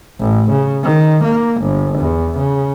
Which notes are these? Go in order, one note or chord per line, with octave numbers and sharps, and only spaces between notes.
A1
C#3
D#3
A#3
G1
E2
C#3